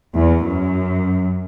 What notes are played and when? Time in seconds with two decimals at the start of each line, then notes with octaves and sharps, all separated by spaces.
0.13 E2
0.44 F#2